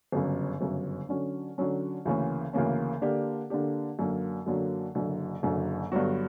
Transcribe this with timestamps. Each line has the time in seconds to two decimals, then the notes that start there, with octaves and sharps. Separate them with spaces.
0.12 G1 F#2 C#3
0.61 G1 F#2 C#3
1.09 D3 F#3 C#4
1.58 D3 F#3 C#4
2.05 D2 C#3 E3 A#3 C#4
2.53 D2 C#3 E3 A#3 C#4
3.02 D3 A#3 D4 G4
3.50 D3 A#3 D4 G4
3.99 F#2 D3 F#3 A#3
4.46 F#2 D3 F#3 A#3
4.95 F#1 F#2 D3
5.43 F#1 F#2 D3
5.92 G2 D3 F#3 B3 F#4